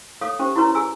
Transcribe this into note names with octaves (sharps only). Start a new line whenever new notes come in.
A4 C#5 F5 D6 D#6
C#4 G4 C5
E4 F#4 B4 C#5 A#5
G#4 G#5 E6